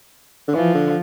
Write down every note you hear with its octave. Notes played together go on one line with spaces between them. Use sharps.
D3
E3 F3
D3